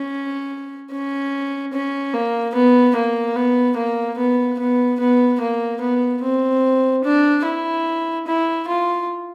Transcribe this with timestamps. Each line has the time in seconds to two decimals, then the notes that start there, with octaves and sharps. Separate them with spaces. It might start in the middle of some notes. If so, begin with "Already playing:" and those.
Already playing: C#4
0.92 C#4
1.74 C#4
2.14 A#3
2.55 B3
2.96 A#3
3.36 B3
3.77 A#3
4.18 B3
4.59 B3
5.00 B3
5.41 A#3
5.81 B3
6.23 C4
7.04 D4
7.45 E4
8.27 E4
8.68 F4